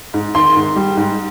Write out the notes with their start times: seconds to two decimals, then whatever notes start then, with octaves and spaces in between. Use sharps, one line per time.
0.14 G#2
0.35 D#3 C6
0.56 G#2
0.76 G3
0.97 G#2